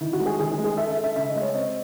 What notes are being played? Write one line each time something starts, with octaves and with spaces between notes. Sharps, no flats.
D#3 E4
F#4
G#3
G#4
D#3 G#4
G#4
G#3
G#4
A4 E5
E5
A4
E5
C#3 E5
D#5
G#3
C#5
C4 D#5